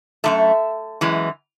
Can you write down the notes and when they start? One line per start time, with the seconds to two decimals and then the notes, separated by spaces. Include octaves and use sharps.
0.24 F#2 E3 A3 E5
1.01 F#2 E3 G#3